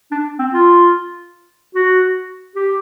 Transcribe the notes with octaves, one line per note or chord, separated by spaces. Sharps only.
D4
C4
F4
F#4
G4